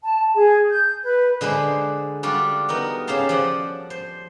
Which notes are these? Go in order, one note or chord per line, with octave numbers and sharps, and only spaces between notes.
A5
G#4
G6
B4
D3 G#3 D4 B4 C5
G3 D4 F4 F#4
B3 D#4 A#4
C#3 G4 C5 F5 A5 C6
F3 D5 F#5
C5